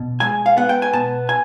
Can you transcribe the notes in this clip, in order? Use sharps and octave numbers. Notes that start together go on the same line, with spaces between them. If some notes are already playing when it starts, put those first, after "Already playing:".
Already playing: B2
G#3 G#5
F5
B3 F#5
G5
G#5
B2 A5
G#5